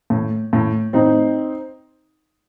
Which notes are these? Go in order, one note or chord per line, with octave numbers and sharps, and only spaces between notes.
A2
A2
A2 C4 D#4